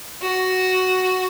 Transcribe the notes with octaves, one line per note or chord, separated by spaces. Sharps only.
F#4